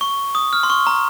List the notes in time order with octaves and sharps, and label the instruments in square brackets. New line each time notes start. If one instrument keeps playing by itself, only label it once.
[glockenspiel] C#6
D#6
F6
C6
C#6
A#5